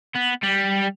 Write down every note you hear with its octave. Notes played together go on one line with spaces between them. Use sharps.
B3
G3